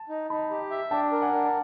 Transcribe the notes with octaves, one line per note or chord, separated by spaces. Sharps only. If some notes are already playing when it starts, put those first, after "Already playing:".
Already playing: A5
D#4
D#4 A5 B5
G4
E5
D4 G5 A5
A#4
F#5 G#5
D4
A5